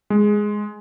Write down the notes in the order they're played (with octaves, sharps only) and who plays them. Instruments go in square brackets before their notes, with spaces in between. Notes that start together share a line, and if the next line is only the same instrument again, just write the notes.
[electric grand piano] G#3